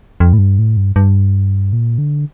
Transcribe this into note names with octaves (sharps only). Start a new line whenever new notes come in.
F2
A2
G2
A2
G2
G2
A#2
D3